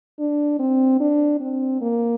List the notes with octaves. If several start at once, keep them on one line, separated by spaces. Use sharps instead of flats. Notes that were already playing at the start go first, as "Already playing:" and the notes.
D4
C4
D4
C4
A#3